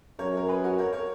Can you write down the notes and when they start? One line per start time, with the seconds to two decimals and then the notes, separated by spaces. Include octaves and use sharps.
0.19 F#2 A#4 C#5
0.37 A#4
0.48 G#4 B4
0.64 F#4 A#4
0.78 A#4 C#5
0.93 A#4 C#5